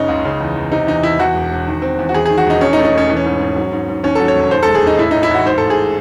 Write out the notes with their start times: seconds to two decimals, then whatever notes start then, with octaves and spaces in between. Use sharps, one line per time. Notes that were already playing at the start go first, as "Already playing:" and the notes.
Already playing: F#1 C#3 C#4 D#4
0.08 C#2
0.25 C#3
0.41 E2
0.55 E2
0.72 C3 D#4
0.87 E2 D#4
1.03 E2 E4
1.19 E2 F#4
1.35 E1
1.52 E1
1.67 D#3
1.82 C4
1.99 E2
2.09 F#4
2.14 E2 G#4
2.26 D#3 G#4
2.38 F#4
2.46 E1 D#4
2.61 E2 C#4
2.73 D#4
2.77 A3
2.85 D#4
2.94 E1 C#4
3.09 E3
3.17 C#4
3.25 G#2
3.40 G#2
3.56 F#3
3.72 G#2
3.88 G#2
4.03 D#2 C#4
4.15 F#3 A4
4.28 C#5
4.35 E1
4.51 D#2 C5
4.63 A4
4.68 G#3
4.75 G#4
4.83 E1 D#4
4.98 A2 E4
5.11 A1 D#4
5.23 E4
5.31 A1 F#4
5.46 G#2 C5
5.58 A1 A4
5.70 G#4